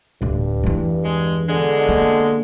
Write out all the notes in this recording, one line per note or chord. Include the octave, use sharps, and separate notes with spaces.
D1 D2 G2
E2 E3
G#3
B2 D3 G#3
A#3